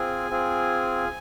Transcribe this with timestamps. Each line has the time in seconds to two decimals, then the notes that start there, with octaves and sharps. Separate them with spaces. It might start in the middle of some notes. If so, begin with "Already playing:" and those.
Already playing: C4 F4 G#4 G#5
0.30 C4 F4 G#4